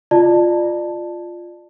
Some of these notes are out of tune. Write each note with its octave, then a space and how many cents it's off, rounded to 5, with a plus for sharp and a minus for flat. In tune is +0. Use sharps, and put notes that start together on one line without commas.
F4 +0 D5 +30 A5 +0